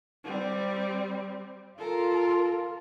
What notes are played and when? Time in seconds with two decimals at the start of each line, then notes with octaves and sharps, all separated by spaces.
0.24 G3 C4
1.79 F4 A4 A#4